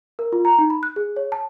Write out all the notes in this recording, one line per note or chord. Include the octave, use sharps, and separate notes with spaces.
A#4
F4
A#5
D#4
B5
F#6
G#4
C#5
A5